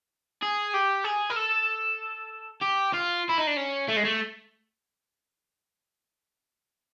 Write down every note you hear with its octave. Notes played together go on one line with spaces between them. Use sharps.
G#4
G4
G#4
A#4
A4
G4
F4
E4
D#4
D4
C#4
A3
G#3
A3